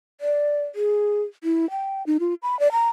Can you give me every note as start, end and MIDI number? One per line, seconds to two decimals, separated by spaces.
0.21 0.64 74
0.75 1.23 68
1.44 1.69 64
1.71 2.05 79
2.06 2.17 63
2.20 2.34 65
2.43 2.59 83
2.60 2.71 74
2.72 2.90 82